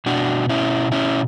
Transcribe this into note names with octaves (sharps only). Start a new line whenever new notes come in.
B2 D4 F#4
C#4 E4
C#4 E4